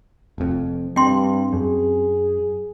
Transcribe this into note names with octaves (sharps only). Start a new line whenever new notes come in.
F1 F2
G2 C4 G5 C6
F#2 G#4